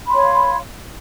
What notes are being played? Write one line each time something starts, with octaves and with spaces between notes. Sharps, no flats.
C#5 F5 B5 C6